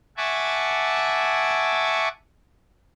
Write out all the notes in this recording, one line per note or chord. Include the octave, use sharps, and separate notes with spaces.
E5 F#5 G#5 A5 C#6 D6